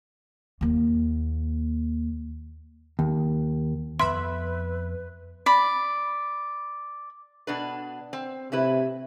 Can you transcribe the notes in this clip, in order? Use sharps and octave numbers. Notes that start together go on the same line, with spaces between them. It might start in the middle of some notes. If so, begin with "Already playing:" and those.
D#2 A#3
D#2
F2 B3 B4 E5 B5 C6
D5 B5
B2 D4 B4
C4
A2 C3 E4 B4